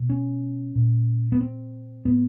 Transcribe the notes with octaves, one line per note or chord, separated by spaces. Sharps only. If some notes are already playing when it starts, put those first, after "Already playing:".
Already playing: B2
C#4
A#2
B3
C4
A2 B3